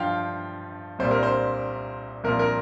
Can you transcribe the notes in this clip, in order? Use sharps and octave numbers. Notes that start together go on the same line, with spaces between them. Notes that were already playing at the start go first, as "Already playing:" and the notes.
Already playing: G2 F3 F5 G5
C2 A#2 G3 C5
A#4
C5
C2 A#2 F3 A#4
A#4